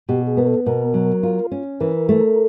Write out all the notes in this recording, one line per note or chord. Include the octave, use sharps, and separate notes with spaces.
B2 G4
G#4
B3 A#4
A4
B2 A#4
F#3
F4
C#4
E3 A#4
A3